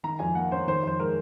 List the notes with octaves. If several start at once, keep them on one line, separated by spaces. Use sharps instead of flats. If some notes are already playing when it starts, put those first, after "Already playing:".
D#3 A#5
F2 G#5
A#3 F#5
C#4 C5
D#3 C5
F2 C5
G#3 A#4